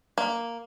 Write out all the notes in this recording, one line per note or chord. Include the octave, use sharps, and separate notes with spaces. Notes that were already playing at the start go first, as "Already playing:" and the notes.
A#3